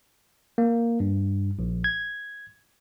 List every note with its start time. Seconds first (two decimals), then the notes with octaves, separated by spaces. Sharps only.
0.58 A#3
1.00 G2
1.59 A#1
1.84 G#6